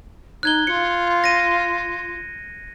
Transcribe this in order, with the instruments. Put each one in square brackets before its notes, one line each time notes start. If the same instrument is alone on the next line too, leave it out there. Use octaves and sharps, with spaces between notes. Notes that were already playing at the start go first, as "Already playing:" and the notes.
[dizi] D#4 [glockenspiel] F#6 G#6 G7
[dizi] F4 [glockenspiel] C#7
[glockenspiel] A#6 D#7